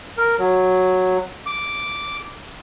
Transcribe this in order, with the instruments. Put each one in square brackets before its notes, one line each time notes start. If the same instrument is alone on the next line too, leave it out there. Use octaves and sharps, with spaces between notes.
[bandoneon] A#4
F#3
D6